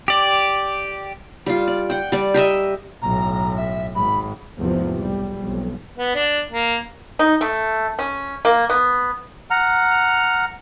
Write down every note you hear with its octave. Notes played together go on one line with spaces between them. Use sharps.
G4 D5
G3 F4
D5
F#5 G5
G3 D5
G4 A#4 D#5 E5
B1 A2 A#5
E5
G#1 B5
F1 E2 G#2 C3 F3
B1 G3
B1 F2
B3
D4
A#3
D#4
A3
C#4
A#3
B3
F#5 A#5 F6